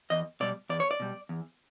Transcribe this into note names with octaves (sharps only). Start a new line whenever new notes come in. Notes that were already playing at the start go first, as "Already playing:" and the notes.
E2 D#5
B2 G3 D5
E2 D5
C#5
D5
B2 G3
E2